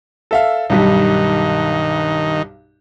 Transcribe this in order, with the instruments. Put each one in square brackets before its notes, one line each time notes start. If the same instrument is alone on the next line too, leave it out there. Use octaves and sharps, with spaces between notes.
[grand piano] A4 E5 F5
[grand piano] B1 G2 G3 [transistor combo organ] D#3